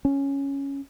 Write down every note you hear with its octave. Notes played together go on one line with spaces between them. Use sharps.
C#4